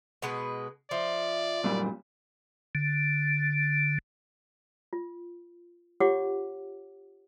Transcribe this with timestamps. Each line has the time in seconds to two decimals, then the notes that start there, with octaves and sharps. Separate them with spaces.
0.22 B2 G#3 B4
0.91 F3 D5 E5
1.64 F#2 A#2 G3 A#4
2.75 D3
4.93 F4
6.00 F4 G4 C#5 F#5 D6